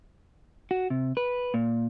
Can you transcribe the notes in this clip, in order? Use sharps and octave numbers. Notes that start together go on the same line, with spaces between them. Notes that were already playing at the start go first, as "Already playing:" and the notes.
F#4
C3
B4
A#2